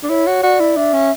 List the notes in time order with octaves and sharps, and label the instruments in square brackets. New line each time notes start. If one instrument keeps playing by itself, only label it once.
[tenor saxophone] D4
[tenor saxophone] E4 [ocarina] C#5
[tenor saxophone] F#4
[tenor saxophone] F#4 [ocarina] D5
[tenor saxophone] E4
[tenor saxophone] D4 [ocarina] E5
[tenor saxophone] C#4